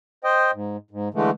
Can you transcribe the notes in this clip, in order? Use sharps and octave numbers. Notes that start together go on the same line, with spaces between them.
C5 D#5 G5
G#2
G#2
D3 E3 G#3 A3